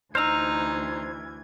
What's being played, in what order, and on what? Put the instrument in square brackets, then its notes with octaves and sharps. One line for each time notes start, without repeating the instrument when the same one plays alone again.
[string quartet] D2 E3 G#6 [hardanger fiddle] D#4 [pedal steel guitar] C5 A#5 [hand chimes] E6 F6